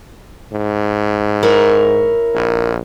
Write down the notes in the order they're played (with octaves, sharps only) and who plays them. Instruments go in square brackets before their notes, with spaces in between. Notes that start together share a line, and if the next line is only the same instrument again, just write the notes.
[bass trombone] G#2
[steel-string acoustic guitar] E4 A#4 C#5
[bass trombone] A#1